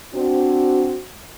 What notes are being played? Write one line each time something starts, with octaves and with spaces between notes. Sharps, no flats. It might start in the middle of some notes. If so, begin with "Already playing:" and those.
C4 D4 F#4 C5